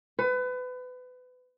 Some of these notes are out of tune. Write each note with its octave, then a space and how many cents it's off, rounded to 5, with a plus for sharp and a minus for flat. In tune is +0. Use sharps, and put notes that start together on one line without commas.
B4 +30